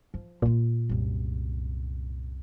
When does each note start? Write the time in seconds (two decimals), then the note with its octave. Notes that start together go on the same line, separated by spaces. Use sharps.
0.14 F3
0.42 A#2 D#4 F4
0.89 C2 F#2